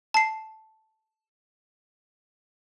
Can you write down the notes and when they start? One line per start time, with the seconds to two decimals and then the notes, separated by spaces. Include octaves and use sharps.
0.14 A5 C7